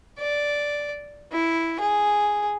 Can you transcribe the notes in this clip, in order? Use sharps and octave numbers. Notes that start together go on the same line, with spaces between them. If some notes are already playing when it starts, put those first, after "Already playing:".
D5
E4
G#4